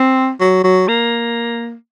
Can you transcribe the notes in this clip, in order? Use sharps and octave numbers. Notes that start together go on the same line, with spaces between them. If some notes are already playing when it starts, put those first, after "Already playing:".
Already playing: C4
F#3
F#3
A#3